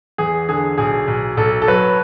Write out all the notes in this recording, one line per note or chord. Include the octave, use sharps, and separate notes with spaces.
E2 G#4
D3 G#4
B1 G#4
B1
B1 A4
A4
F#3 B4